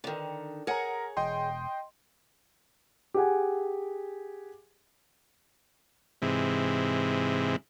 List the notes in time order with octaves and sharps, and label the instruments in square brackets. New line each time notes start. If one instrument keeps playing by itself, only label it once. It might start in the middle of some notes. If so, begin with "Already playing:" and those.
[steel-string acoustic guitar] D3 D#3
[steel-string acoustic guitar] G#4 C#5 F#5 [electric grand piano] A#4 A#5
[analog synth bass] E1 [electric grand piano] D#5 G5 C6
[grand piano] G4 G#4 F#5 G#5
[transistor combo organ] G#2 C3 E3